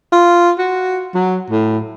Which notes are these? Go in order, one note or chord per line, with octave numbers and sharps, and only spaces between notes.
F4
F#4
F#3
A2